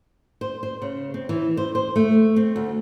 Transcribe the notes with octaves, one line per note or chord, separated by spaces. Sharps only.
C5
C5
C#3
C4
E3
C5
C5
A3
C4
D2